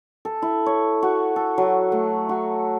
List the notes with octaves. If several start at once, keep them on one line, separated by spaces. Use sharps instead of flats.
A4
E4
C#5
F#4
A4
F#3
A3
F#4